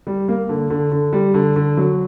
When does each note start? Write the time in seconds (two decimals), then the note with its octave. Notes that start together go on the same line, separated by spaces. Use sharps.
0.07 G3
0.28 A#3
0.49 D3
0.70 D3
0.92 D3
1.13 G3
1.34 D3
1.56 D3
1.77 F#3